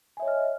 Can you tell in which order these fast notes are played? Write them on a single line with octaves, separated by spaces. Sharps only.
G#5 E5 C#5 D#5 F6